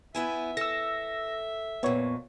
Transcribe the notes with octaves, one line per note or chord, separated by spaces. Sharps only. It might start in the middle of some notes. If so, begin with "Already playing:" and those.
B3 E4 E5 G#5
A4 E6 A#6
F2 A#2 B3 C#5